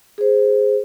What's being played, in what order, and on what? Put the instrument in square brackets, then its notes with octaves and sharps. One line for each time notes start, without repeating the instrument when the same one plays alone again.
[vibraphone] G#4 C5